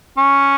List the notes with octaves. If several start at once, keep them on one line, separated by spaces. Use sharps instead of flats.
C#4